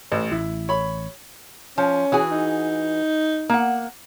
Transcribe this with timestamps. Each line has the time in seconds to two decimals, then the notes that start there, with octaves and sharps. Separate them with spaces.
0.12 A1
0.32 A1 E4
0.69 C#5 B5
1.78 F3 C#4
2.12 E3 F#4 G#4
2.31 D#4
3.49 A#3 F#5